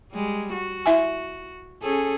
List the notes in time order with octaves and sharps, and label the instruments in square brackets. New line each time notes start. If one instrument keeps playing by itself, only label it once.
[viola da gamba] G3 G#3
F#4
[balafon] E4 E5 G#5
[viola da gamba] C#4 G#4 A4